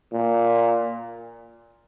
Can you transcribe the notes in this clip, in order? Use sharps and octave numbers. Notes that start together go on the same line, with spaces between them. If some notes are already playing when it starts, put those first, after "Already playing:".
A#2